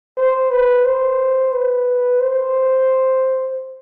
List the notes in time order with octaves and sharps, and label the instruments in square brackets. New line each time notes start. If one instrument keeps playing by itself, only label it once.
[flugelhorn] C5
B4
C5
B4
C5